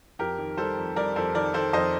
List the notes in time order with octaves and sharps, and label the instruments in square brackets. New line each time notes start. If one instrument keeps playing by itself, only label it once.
[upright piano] F2 G4 A#4
D#3
G3 A4 C5
F2
G3 A#4 D5
F2 A4 C5
D#3 A#4 D5
D#3 A4 C5
F2 C5 D#5